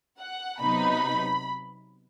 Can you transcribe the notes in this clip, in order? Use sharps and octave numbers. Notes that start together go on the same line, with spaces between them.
F#5
C3 F#3 B3 D#4 B5